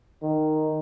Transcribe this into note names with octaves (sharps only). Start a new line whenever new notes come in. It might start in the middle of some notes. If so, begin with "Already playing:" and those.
D#3